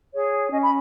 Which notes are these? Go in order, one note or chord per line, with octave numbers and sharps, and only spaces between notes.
G#4 C#5
C#4 D#5
B5